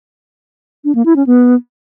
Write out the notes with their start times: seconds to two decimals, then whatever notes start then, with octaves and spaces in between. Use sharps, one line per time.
0.84 D4
0.95 A#3
1.05 E4
1.16 C#4
1.26 B3